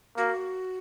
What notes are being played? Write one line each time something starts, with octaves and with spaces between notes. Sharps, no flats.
A#3 F#4